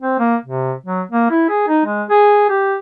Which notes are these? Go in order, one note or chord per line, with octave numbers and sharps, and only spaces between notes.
C4
A#3
C3
F#3
A#3
E4
G#4
D#4
G#3
G#4
G4